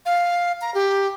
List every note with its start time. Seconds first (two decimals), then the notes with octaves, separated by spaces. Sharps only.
0.06 F5
0.61 A#5
0.74 G4